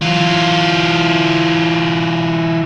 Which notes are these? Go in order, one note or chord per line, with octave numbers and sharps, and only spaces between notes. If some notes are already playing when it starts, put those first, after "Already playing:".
E3 F4